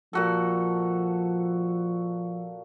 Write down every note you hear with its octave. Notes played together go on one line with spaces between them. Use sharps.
A#2 F3 F#4 A4